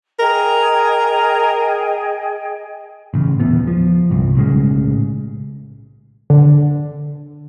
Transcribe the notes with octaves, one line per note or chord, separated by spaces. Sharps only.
G#4 A#4 D#5 G5
A1 C#3
D#1 E2 B3
F3
G1 C2
B1 A2 C#3 G#3
D3